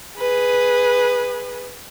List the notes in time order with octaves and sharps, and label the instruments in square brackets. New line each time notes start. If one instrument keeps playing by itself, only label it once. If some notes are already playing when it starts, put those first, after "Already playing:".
[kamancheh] G#4 B4